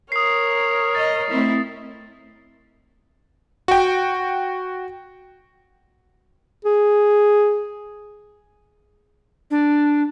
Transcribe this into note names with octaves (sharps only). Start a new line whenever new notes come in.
A#4 C#5 D#6 C7
D#5 A6
A3 C4 E4
F#4 G5
G#4
D4